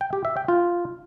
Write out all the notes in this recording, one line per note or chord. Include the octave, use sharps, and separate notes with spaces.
G5
G4
E5
G5
F4